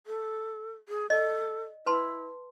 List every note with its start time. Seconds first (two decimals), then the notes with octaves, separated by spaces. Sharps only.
0.07 A4
0.89 G#4
1.10 A4 D5 D#5
1.86 E4 B4 A5 C6